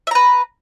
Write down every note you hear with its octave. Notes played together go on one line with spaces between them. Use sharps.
B4 E5 A#5